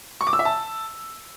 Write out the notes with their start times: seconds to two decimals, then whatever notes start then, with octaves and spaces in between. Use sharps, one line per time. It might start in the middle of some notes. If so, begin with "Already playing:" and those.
0.21 C#6
0.27 D6
0.33 E6
0.39 E5
0.45 A5